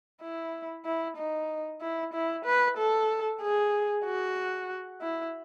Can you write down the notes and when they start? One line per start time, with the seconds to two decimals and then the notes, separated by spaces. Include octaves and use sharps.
0.21 E4
0.85 E4
1.17 D#4
1.81 E4
2.14 E4
2.45 B4
2.77 A4
3.41 G#4
4.05 F#4
5.02 E4